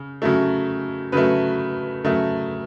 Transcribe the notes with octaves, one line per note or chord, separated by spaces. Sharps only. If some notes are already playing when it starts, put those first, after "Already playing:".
Already playing: C#3
C#3 F#3 A3
C#3 F#3 A3 B4
C#3 F#3 A3